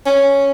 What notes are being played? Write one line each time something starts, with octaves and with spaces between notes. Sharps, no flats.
C#4